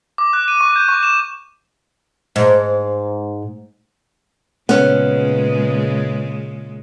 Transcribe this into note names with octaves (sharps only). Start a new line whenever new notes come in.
D6
F#6
D#7
C#6
G6
C#6
E7
G#2
A#2 C#3 G#3 B3 C#4